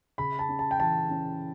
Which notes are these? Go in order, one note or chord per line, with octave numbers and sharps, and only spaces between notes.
C#3 B5
A5
C#4
A5
G5
E3 A5
C#4